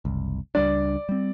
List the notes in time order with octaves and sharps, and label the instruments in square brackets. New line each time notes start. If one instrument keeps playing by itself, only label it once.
[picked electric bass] F#1 C2
[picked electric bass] C#2 G3 D4 [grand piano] D5
[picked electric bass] G3 C4